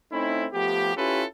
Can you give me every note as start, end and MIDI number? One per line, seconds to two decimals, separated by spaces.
0.11 0.46 57
0.11 0.46 60
0.11 0.46 61
0.11 0.46 63
0.11 0.46 64
0.53 0.92 53
0.53 0.92 57
0.53 0.92 59
0.53 0.92 67
0.95 1.23 61
0.95 1.23 64
0.95 1.23 65
0.95 1.23 67
0.95 1.23 69
0.95 1.23 71